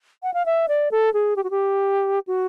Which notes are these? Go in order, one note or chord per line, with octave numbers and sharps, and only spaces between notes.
F#5
F5
E5
D5
A4
G#4
G4
F#4
G4
F#4